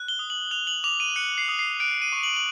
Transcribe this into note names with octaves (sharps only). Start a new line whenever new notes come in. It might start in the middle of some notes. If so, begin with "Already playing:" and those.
Already playing: F#6
G7
D#6
F#7
F#6 F7
F#7
D6 F7
D#7
F#6 C#7
C7
D#6
C7
F#6 D7
D#7
C#6
F#7
F#7